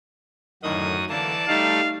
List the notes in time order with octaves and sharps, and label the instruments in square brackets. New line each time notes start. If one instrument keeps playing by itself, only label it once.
[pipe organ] F#2 F#4 D#6 [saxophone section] A2 D3 D#3
[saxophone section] D3 A#3 [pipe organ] E3 [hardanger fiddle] D5 A5
[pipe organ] G3 A3 [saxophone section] D#4 [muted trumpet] F5